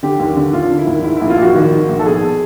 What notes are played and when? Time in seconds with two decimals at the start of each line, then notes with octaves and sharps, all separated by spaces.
0.03 D3 G4
0.20 D#2
0.36 D3
0.53 D#2 F4
0.71 D3
0.78 E4
0.87 D#2
1.04 G#2 E4
1.17 A#1 E4
1.30 F4
1.38 A#1 F#4
1.55 D#3
1.72 G#2
1.89 A#1
1.99 A4
2.05 B2 G#4